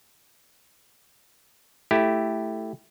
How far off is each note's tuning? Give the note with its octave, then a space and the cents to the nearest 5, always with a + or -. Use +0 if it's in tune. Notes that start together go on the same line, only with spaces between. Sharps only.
A3 +0 E4 +0 G4 +0